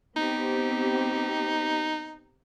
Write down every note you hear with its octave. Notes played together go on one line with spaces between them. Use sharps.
B3 C4 D#4 G4